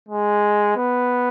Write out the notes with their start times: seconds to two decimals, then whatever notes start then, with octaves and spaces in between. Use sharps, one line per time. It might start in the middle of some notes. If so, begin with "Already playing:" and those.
0.09 G#3
0.76 B3